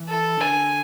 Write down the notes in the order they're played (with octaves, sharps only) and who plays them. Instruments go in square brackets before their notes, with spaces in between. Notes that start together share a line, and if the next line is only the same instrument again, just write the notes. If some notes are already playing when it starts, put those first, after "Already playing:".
Already playing: [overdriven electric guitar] E3
[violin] A4
[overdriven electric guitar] C#3
[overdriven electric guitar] D3 [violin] G#5